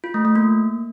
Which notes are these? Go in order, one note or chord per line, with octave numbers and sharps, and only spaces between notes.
F4
A3
A3
A#3